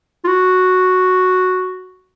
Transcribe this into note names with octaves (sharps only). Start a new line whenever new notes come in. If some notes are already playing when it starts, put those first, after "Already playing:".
F4
F#4